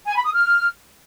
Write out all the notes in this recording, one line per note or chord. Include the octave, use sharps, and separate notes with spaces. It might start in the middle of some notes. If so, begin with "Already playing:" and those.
G#5
B5
D#6
F6